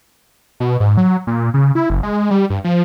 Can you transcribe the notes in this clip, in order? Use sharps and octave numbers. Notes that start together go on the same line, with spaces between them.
B2
G#2
F#3
A#2
C#3
E4
F#1
G#3
G3
G2
F3